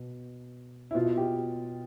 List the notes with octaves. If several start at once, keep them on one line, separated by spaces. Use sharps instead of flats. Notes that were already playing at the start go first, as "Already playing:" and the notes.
Already playing: B2
E4
B2 F4
G4